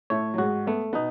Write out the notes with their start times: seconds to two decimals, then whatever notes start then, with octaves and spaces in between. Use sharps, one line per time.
0.10 A2 A3 C#5
0.34 F#3
0.38 G#2 G#3 F#4
0.67 A3 B3
0.93 B2 B3 D#4